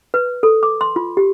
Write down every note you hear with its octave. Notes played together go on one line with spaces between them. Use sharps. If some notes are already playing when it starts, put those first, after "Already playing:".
B4
A4
D6
C6
F4
G4